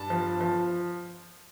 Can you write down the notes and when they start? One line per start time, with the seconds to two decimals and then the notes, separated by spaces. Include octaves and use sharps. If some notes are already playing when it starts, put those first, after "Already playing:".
Already playing: G2 A5
0.10 F3
0.41 F3